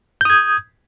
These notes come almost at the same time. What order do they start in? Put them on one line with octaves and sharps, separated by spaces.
G6 D#6 G#6